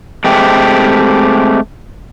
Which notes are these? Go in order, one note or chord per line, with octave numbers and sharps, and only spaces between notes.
G#3 A3 C4 G4